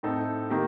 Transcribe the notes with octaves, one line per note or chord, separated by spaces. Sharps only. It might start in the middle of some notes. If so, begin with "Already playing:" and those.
A2 A3 C4 D#4 A4
D#3 A#3 D#4 G4